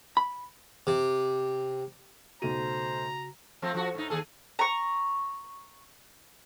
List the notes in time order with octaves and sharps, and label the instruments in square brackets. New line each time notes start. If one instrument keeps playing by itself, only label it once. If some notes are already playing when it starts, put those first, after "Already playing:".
[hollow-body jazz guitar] B5
[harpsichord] C3
[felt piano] B1 A3 D#7 [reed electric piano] C#3 F#4 [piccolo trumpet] C5 [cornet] A#5
[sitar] F3 A3 C4
F3 F#4
A2 D#4
D#2 G#4 A4
[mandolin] A#5 C#6